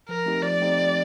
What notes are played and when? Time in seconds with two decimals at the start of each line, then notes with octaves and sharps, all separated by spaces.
0.09 F3 A#4
0.26 A3 C4 D#4 G4
0.43 F3 D5
0.61 A3 C4 D#4 G4
0.77 F3